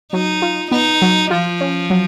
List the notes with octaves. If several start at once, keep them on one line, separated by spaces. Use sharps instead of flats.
F#3 D#4
F4
B3 D#4
F#3
F3 F4
C#4
F#3